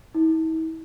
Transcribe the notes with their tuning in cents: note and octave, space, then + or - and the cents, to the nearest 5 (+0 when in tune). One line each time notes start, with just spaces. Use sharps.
E4 -45